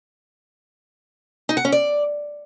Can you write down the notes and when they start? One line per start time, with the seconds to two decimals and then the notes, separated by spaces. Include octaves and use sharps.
1.49 D#4
1.57 F#5
1.65 C#4
1.72 D5